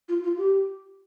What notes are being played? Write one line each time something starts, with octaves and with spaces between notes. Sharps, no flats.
F4
F4
G4